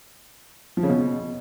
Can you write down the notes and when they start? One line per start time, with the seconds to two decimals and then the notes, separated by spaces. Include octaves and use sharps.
0.77 F3
0.83 C#3
0.89 B2